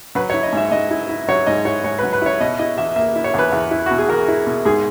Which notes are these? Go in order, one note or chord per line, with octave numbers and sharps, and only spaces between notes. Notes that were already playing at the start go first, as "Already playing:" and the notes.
F#3 B4
C#5
E4
D#5
G#2 E5
G#2 D#5
E4
E4
F#3 C#5
G#2 D#5
E4 C#5
G#2 C#5
B4
F#3
B4
E4 C#5
B2 D#5
E4 D#5
E2 E5
A#3 E5
E4
C#5
E2 B4
E2
E4
B2 F#4
G#4
E2 A#4
E4
B2
G#2 G#4